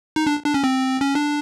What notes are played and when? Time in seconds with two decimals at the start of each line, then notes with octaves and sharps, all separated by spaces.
0.16 D#4
0.27 D4
0.45 D4
0.54 C#4
0.64 C4
1.01 C#4
1.15 D4